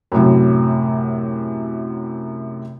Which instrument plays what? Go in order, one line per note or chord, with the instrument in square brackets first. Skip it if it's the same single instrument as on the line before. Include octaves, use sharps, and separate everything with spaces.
[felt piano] F#2 A2 C3 F#3